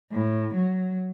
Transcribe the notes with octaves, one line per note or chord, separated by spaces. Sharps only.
A2
F#3